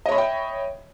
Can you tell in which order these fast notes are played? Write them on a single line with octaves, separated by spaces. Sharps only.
D#5 C#5 B5 E5 G5